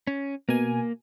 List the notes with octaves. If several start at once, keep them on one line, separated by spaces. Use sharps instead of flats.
C#4
B2 A#3 G#5